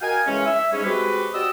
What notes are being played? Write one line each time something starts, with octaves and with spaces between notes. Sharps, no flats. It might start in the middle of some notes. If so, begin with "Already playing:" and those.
F#4 A#4 D#5 F5 G5 G#5
C#3 E3 G#3 C#4
E5
G#2 G3 C#4
G#3 C4 F#4 G4 B4
F#4 G4 D5 D#5 D#6 E6